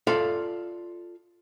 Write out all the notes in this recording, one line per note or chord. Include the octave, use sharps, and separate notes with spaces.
F4 A4 D5 E5 F5